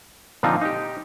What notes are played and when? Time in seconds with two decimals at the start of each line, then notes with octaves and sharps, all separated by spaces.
0.43 A#2 D3 F3 C4 D#4 F4
0.61 D#4 G4